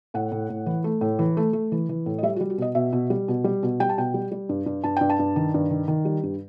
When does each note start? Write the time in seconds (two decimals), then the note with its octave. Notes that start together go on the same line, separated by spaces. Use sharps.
0.14 A2 F#5
0.32 A2
0.49 A2
0.66 E3
0.84 A3
1.01 A2
1.19 E3
1.37 A3
1.53 A3
1.72 E3
1.89 E3
2.06 A2
2.18 D#5
2.23 G3 E5
2.36 F#4
2.41 G3
2.50 F#4
2.58 B2 D#5
2.75 B2 E5
2.93 B2
3.10 G3
3.28 B2
3.44 G3
3.63 B2
3.80 G3 G5
3.89 A5
3.98 B2 G5
4.14 G3
4.32 G3
4.49 G2
4.66 G2
4.84 G2 A5
4.97 G2 G5
5.10 A5
5.19 G2
5.36 D#3
5.54 G2
5.70 D#3
5.88 D#3
6.05 G3
6.23 G2